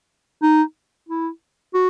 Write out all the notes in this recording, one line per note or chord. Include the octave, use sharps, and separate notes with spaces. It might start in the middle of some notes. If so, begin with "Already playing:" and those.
D#4
E4
F#4